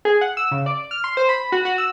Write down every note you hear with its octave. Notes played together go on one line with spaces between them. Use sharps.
G#4
F#5
E6
C#3
D5
F6
C6
C5
B5
F#4
F#4
E6